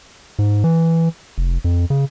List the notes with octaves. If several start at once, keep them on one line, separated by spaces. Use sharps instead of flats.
G#2
E3
F1
F2
C#3